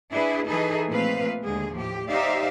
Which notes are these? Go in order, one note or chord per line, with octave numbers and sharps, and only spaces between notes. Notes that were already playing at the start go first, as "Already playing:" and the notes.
D4 E4 G#4 B4
E3 D#4 G#4 A4 B4
A#2 F3 A3 C4 B4 F5
D#2 D3 G#3 G#4
A2 F3 G4
D#4 G4 C5 D5 E5 F5